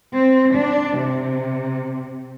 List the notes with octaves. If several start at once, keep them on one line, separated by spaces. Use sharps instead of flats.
C4
D4
C3